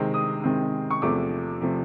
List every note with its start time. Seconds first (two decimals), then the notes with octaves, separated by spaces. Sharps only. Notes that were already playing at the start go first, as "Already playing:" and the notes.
Already playing: C3 D#3 G#3 C4
0.14 D#6
0.44 C3 D#3 G#3 C4
0.90 C#6
1.02 E2 C3 F3 A3 D6
1.61 C3 F3 A3